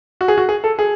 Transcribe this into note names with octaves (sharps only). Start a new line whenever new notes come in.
F#4
G#4
F#4
G#4
A4
G#4